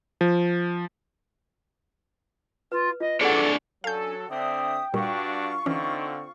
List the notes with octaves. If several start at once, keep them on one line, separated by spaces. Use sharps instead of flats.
F3
F4 B4
F4 D#5
D4 G#4 A4 C#5 D5 F#5
D6
F#3 C#4 D4 F#4 A4 F5 G#5 G6
D3 C4 D4 E5 G5 D#6
G2 A#2 G3 D4 F4 F#4 C#6
D3 E3 C4 C#4 D#4